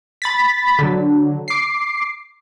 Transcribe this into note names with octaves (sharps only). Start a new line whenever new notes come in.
B5 A6 B6
D3 F#3
D6 C7